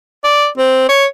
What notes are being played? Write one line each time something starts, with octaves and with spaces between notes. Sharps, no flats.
D5
C4
C#5